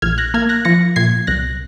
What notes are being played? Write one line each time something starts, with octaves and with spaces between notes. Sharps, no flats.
A#1 F6 G#6
F#6 A#6
A#3 F6 G#6
F#6 A#6
F3 A#6 C#7
A#2 G#6 C7
C2 F#6 A#6